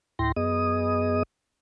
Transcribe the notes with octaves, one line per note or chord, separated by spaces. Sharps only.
D2 A2 E4 G5 C6 A#6
F#2 B3 G#4 D#5 D#6